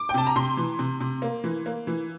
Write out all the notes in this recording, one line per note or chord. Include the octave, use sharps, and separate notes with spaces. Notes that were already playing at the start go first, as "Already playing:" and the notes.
Already playing: D6
G5
C3 A5
A#5
C3 C6
E3
C3
C3
A#3
E3
A#3
E3